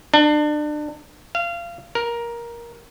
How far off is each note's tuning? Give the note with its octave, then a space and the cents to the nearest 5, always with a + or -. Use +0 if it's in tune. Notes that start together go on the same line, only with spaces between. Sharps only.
D4 +30
F5 -25
A#4 +15